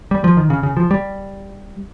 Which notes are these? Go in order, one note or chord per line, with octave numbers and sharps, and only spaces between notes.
G3
F3
D#3
C#3
C#3
F3
G3